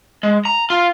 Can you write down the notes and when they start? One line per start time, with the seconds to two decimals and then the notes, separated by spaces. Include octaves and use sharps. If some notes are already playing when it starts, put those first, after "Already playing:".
0.23 G#3
0.45 A#5
0.70 F4